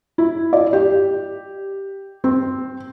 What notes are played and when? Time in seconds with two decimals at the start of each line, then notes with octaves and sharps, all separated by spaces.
0.18 E4
0.53 D5
0.73 G4
2.24 C4